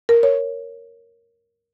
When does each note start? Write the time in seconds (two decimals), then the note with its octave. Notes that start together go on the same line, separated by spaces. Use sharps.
0.09 A#4
0.23 C#5